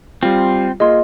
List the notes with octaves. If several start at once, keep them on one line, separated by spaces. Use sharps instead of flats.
G3 C4 F4
A#3 F4 G#4 D#5 C6